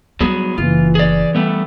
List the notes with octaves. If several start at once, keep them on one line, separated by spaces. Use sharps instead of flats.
F#3 G3 B3 D#4 G#4
F#1 E3 F4
G#4 D5
G3 A3 B3